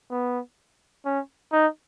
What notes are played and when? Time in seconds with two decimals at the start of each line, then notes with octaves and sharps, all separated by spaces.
0.11 B3
1.05 C#4
1.53 D#4